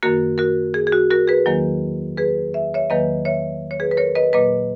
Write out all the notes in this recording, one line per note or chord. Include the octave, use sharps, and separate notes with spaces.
F#2 D#3 A#3 F#4 A#4
F#4 A#4
G#4
G#4
F#4
F#4 A#4
G#4 B4
E2 D#3 F#3 A#3
G#4 B4
E5
C#5 E5
E2 D#3 F#3 A#3 B4 D#5
C#5 E5
C#5
G#4 B4
B4
A#4 C#5
B4 D#5
A#2 F#3 A#3 B4 D#5